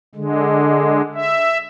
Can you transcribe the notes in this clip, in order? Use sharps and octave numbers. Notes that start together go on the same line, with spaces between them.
D3 G#3
E5